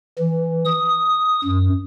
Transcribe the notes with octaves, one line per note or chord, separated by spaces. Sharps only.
E3
D#6
F#2